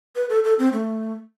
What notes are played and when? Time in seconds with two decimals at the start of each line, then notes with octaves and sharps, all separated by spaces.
0.16 B4
0.29 A4
0.44 A4
0.59 C4
0.73 A3